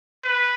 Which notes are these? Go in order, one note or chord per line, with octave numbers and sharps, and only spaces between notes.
B4